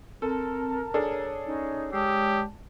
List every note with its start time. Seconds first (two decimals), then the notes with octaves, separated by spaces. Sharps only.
0.22 C4 A4 A#4 A5 A#5
0.94 D4 G#4 A4 C#5
1.45 C#4 D#4
1.93 G#3 G4 C#5 D5 A5 D#6 E6